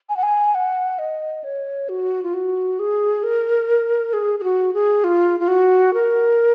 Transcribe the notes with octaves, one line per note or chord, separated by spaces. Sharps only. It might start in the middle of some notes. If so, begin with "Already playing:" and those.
G#5
F#5
G#5
F#5
D#5
C#5
F#4
F4
F#4
G#4
A#4
G#4
G#4
F#4
G#4
F4
F4
F#4
A#4